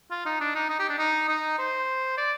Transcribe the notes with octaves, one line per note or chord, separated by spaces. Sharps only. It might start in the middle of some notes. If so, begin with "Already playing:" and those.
F4
D#4
D4
D#4
D#4
G4
D4
D#4
D#4
C5
D5